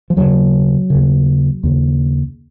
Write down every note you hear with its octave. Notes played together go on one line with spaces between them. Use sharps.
F3
D#2 C#3 F#3
D#2 C#3
D#2 C#3